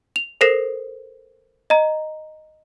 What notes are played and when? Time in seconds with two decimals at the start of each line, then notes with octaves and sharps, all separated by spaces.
0.16 F7
0.41 A4 A#4 C5 A#6 C7 E7
1.70 D#5 A#5